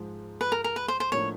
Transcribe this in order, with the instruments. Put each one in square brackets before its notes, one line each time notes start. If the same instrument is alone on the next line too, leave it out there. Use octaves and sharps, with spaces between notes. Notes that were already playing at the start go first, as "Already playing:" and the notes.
Already playing: [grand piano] G#2 F3 G#3
[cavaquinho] B4
A#4
A#4
B4
C5
C5
[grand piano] A2 F3 A#3 D4 [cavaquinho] C#5